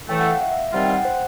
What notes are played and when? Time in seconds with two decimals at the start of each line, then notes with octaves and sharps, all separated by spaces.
0.09 A2 E3 A3 G5
0.20 F#5
0.31 F5
0.41 E5
0.52 E5
0.73 C3 D#3 G3 C4 F4 F#5
0.84 G5
0.89 F#5
1.05 C5